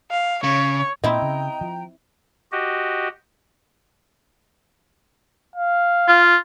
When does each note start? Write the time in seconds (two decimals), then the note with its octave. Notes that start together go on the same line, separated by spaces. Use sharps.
0.11 F5
0.44 C#3 C#5
1.04 A#2 C4 E4 D#5 G5 A#5
1.22 C#3
1.61 F3
2.52 F#4 G4 D#5
5.56 F5
6.08 F4